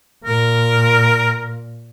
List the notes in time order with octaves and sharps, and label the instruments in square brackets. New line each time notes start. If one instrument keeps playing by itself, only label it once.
[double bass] A#2 [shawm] A#4